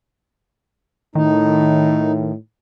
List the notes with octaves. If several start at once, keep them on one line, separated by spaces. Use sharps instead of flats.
A2 D#3 D#4